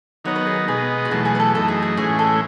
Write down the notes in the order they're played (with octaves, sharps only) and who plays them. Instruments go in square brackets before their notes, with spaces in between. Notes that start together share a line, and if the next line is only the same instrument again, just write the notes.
[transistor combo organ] D#3 F#3 B3 D#4 [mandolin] C#5
[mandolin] B4
G#4
[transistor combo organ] B2 G#3 B3 D#4 [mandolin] G#4
[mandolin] F#4
[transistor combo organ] E2 B2 F#3 A3 [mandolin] G#4
[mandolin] G#4
B4
A4
[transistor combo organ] F#2 E3 A3 D#4 [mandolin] A4
[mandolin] G#4
G#4
[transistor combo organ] A2 E3 G#3 C#4 [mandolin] G#4
[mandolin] A4